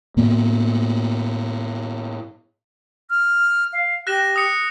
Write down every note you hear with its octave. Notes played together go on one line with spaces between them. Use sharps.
A2 A#3 B3
F6
F5
G4 F#6 A#6 E7
D#6 C#7